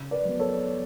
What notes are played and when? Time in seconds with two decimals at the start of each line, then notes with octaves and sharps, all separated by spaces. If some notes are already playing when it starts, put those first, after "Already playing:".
Already playing: C#3
0.11 B4 D5
0.25 F#3 B3
0.40 A4 C#5